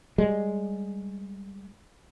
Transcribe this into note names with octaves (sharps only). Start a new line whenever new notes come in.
G3 G#3